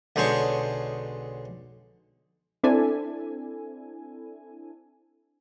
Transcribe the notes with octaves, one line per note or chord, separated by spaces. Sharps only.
B1 D3 G#3 C5 C#5 C#6
C4 D4 E4 A4 G#5